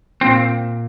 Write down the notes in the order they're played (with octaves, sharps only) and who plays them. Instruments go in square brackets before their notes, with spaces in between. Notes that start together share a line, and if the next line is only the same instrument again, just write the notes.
[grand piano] A#2 [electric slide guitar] C4